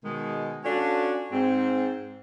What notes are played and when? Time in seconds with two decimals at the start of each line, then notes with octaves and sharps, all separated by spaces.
0.04 B2 D#3 G#3
0.64 C#4 D4 F4 F#4 A4
1.32 G#2 C4